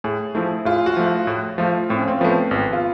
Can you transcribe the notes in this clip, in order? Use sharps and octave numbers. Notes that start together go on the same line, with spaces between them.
A2 G#4
F3 A3 E4
A2 F4
F#4
F3 A3
F4
A2
F3 A3 F4
A2 C4
C#4
C4
F3 A3 B3
G#1 B3
F4